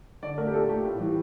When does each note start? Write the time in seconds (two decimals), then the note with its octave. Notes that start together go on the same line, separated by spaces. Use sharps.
0.22 D3 D5
0.38 A3 A#4
0.47 G4
0.54 A#2 A4
0.69 A3 G4
0.84 A2
1.00 E3 G3